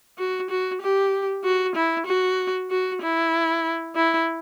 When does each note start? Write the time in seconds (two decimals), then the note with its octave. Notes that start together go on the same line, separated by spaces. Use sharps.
0.18 F#4
0.50 F#4
0.81 G4
1.44 F#4
1.75 E4
2.06 F#4
2.71 F#4
3.02 E4
3.96 E4